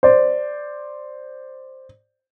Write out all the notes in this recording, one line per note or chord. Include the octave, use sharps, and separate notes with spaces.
C5 D5